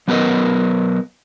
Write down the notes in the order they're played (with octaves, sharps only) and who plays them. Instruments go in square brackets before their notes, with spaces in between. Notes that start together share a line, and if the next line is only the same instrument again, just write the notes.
[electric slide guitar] F#3 B3 A#4 B4 D#5